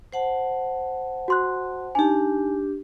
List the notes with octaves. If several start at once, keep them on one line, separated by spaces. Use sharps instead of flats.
C5 F#5 A5
F#4 C6 F#6
D4 D#4 G4 G#5